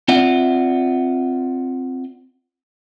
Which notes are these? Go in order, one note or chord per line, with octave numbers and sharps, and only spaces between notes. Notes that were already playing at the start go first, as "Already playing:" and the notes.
C4 F4 D5 E5 F#5